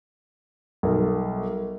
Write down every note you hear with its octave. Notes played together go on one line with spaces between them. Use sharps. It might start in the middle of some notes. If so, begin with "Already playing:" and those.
B1 G3 A#4 E5